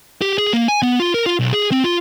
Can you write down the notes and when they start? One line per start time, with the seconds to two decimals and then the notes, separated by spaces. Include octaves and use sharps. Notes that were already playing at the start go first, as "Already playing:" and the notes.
0.21 G4
0.38 G#4
0.53 A#3
0.68 G#5
0.82 B3
1.00 F4
1.14 A#4
1.26 F4
1.39 B1
1.53 G#4
1.72 C4
1.84 F4